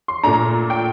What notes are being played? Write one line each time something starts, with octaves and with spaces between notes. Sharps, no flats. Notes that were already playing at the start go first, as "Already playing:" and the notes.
C6
A#2 A3 D4 A#5
G5